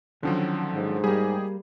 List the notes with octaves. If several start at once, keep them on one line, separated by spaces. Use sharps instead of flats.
D3 D#3 F3 F#3 C#4
G#2
G3 A#3 G4 G#4